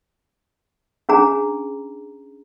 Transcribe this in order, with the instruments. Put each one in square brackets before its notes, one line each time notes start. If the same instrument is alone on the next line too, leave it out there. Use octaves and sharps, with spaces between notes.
[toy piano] C#4 D4 G#4 A#5